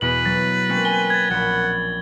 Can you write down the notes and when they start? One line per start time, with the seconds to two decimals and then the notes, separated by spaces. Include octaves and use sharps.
0.01 E2 B2 B4 F#7
0.25 F#3 A6
0.69 A#3 C4 C#4
0.85 G#5 G7
1.10 G#6 A6
1.30 A#1 F#5 B5